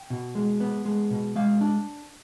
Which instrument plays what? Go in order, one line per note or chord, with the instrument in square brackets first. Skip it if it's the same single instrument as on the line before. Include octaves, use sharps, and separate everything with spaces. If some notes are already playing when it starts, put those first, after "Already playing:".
Already playing: [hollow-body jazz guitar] G5
B2
G#3
B3
G#3
B2
G#3 F5
D4